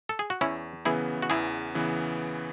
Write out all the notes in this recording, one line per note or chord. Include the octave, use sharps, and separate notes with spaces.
A4
G#4
F#4
E2 C#4 E4
C#3 E3 B3 E4 G#4
F#4
E2 E4 G#4
C#3 E3 B3